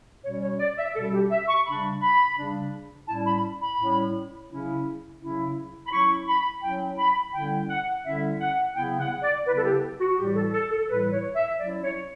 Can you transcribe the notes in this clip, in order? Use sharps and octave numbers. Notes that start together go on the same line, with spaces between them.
B2 G3 C#4 C#5
C#5
D5
E5
B2 G3 C#4 A4
G4
E5
C#6
C#3 G3 D4 B5
B5
C#3 G3 D4
A2 G3 C#4 E4 A5
B5
B5
A2 G3 C#4 E4
C#3 F#3 C#4 E4
C#3 F#3 C#4 E4
B5
F#3 C#4 E4 C#6
B5
F#3 C#4 E4 G5
B5
D3 G3 C#4 E4 G5
F#5
D3 G3 C#4 E4 E5
F#5
C#3 F#3 B3 E4 G5
F#5
D5
C#3 F#3 B3 E4 B4
A4
G4
F#4
A2 E3 G3 G4
A4
A4
A4
A2 E3 G3 B4
C#5
E5
F#3 C#4 E4 D5
C#5